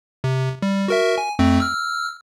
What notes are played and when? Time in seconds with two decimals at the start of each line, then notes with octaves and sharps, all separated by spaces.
0.24 C3
0.62 G3
0.88 F#4 A#4 E5
1.18 G#5
1.39 F2 A3 C4
1.60 E6 F6